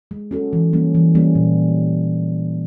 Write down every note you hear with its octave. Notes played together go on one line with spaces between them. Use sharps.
G#3
C#4 F#4 A4
E3
G3 A#3 C#4
E3
G3 A#3 C#4
A#2